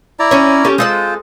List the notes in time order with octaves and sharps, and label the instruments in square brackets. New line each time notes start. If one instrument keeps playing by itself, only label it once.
[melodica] E4 D5 A#5
[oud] C#4 C#5
C#4 G4 A4
[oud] G#3 A4 D5 [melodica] F4 C5